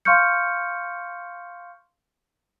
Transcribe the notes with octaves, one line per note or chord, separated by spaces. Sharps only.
F5 C6 C#6 F6 G6 C#7